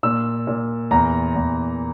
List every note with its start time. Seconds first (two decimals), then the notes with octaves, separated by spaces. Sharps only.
0.03 A#2 E6
0.47 A#2
0.91 E2 A#5
1.36 E2